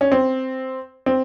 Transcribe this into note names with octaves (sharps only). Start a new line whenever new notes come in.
C#4
C4
C4